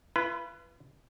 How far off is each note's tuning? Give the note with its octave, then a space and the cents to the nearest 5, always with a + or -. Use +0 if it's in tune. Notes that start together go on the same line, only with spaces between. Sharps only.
F4 -45 B4 +0